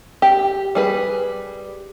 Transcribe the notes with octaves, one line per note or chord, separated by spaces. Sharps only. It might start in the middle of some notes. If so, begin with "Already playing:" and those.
G4
G3 G#4 B4